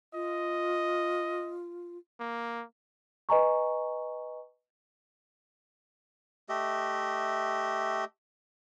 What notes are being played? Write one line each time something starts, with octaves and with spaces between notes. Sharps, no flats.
F4 D#5
A#3
B4 D#5 G#5 A#5 C#6
A3 G4 D#5 E5